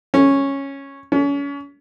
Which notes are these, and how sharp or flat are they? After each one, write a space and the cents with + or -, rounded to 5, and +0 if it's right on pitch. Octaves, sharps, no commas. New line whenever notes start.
C#4 -10
C#4 +30